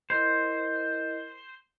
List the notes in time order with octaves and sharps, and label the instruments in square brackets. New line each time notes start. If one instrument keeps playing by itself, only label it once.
[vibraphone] E4 A#4 D#5 [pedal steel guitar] C5